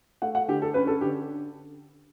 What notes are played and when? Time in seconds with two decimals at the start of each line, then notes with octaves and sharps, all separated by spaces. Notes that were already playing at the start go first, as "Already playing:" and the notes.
0.22 A3 F#5
0.35 F#5
0.48 D3 G4
0.62 A4
0.74 C#4 B4
0.87 A4
1.01 D3 G4